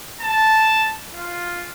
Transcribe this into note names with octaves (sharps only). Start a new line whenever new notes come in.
A5
F4